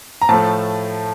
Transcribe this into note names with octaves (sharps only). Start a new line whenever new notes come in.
A#5
A2 F3 A3 A5